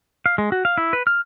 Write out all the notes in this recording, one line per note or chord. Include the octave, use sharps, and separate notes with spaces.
F5
G#3
F#4
F5
E4
B4
F6